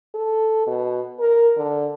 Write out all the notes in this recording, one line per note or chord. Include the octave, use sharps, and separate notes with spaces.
A4
B2
A#4
D3